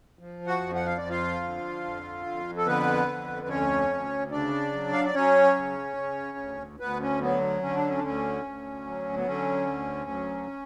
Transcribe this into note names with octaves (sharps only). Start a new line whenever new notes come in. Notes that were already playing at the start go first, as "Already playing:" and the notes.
F3
F#4 F#5
F2
F#5
F5
F3 D5
F4 F5
D3
F2
F2
A4
D3 B3 B4
F2
B4
D2 C#4 C#5
D2
C#3 D4 D5
F#3
F5
D5
F#3 C#4 C#5
C#3
C#3
D2
D2 B3 B4
C#4
F#3 B3
D3 C#4
D4
C#4
D4
D2 C#4
D2
F#3
B3
D3 C#4
D2
F#3